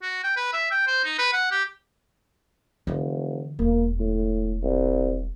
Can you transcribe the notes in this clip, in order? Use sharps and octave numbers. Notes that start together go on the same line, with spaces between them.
F#4
G5
B4
E5
G5
C5
D#4
B4
F#5
G4
F1 D3 E3
E1 A#3
A2
C2